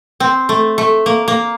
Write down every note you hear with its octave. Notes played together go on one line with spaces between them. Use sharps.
C4
A3
A3
A#3
A#3